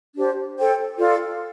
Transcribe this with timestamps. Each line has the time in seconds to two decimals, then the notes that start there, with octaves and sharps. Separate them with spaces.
0.14 D4 G4 C5
0.57 A4 C5 G5
0.99 F4 A4 D5 F5